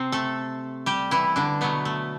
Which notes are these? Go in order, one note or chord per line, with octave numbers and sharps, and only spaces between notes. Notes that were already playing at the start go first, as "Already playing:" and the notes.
Already playing: C3 C4
A3 A4
G3 G4
E3 E4
D3 D4
B2 F#3 A3 B3
A3